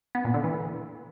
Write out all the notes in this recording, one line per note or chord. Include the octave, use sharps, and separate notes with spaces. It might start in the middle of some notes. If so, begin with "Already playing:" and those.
B3
A#2
D3
E3